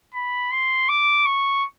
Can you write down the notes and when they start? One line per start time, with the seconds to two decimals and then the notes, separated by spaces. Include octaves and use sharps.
0.14 B5
0.52 C6
0.89 D6
1.26 C#6